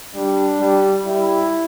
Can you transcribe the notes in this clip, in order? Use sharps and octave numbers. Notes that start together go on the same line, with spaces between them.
G3 D4
G3
G3 E4